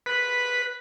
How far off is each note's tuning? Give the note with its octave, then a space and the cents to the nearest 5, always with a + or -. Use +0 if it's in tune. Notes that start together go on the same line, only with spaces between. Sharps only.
B4 -5 B5 +0